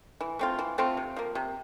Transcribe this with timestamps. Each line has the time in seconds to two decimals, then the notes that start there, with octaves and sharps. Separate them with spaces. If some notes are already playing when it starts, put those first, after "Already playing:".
0.21 E3
0.39 A3 C4 F4
0.59 E3
0.78 A3 C4 F4
0.97 C3
1.16 F3 A#3
1.35 C3